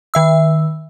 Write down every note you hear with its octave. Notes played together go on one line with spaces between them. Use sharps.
D#3 E5 E6